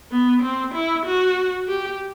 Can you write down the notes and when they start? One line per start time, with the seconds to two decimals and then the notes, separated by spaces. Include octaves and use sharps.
0.11 B3
0.42 C4
0.74 E4
1.06 F#4
1.67 G4